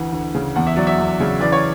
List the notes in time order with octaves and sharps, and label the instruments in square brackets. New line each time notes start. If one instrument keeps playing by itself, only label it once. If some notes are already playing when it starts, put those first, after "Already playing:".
Already playing: [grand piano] D2 E3 F#5
D2
C#3
E2 F#5
E5
F#3 D5
E5
E2
C#3
E3 D5
C#5